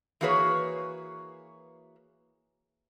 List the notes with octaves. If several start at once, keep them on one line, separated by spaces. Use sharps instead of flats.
E3 A#3 F#4 G#4 B4 C#5